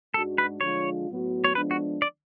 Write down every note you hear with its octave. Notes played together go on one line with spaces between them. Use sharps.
G#2 G#3 D4 F#4 A4
B4
D3 F3 G#3 D4 F4 C#5
A2 F#3 B3 F#4
C#5
F3 G#3 B3 D4 B4
F#4
D5